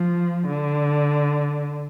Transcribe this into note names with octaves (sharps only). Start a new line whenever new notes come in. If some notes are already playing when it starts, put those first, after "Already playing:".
Already playing: F3
D3